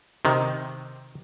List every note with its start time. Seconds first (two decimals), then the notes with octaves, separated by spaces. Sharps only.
0.25 C3 D#3